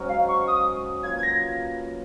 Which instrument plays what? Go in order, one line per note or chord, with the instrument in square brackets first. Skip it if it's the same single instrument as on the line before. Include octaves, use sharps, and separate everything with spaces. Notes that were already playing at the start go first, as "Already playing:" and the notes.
Already playing: [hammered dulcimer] G#2 F#3 C#4
[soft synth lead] F5
C#6
D#6
[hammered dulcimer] F#3 A#3 F4 B4 [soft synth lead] G#6
[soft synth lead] G#6
A#6